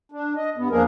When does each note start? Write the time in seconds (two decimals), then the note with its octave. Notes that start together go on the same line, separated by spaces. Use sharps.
0.12 D4
0.36 D#5
0.57 G2 B3
0.71 E2 F3 A#3 D4 G#4 A#4